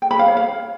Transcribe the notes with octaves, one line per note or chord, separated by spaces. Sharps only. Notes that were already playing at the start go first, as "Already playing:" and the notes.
G5
B5
F5
C#5
F5